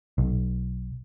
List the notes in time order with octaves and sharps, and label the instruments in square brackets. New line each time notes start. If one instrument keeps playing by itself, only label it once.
[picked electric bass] B1